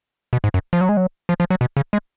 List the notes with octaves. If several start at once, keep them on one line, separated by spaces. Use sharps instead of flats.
B2
G#2
F#2
F3
F#3
G#3
F#3
F3
F3
F#3
B2
C#3
G#3